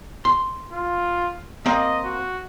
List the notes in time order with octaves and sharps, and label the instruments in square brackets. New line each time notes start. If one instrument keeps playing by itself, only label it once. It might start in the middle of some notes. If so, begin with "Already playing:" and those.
[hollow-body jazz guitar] C6
[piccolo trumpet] F4
[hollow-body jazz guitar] A#3 C4 [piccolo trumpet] D#5
[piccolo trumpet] F#4